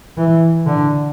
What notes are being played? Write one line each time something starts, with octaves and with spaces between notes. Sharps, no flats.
E3
D3